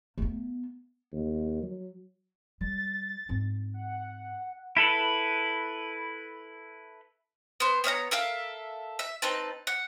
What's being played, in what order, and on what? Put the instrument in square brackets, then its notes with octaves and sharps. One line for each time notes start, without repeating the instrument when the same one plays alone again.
[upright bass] A3 B3
[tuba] D#2
F#3
[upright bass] G3 [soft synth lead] A6
[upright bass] G#2 C4
[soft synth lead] F#5
[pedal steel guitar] E4 A4 B4
[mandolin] B3 C5
B3 C#5 F5 A#5
A4 A#4 E5 F5
E5
C4 D#4 B4 A5
F#5